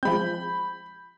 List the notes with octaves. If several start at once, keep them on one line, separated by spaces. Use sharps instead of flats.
F3 G#3 C4 B5 G6